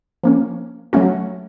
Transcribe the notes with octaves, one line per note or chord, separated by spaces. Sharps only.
F3 A#3 C#4
F#3 A3 C#4 F#4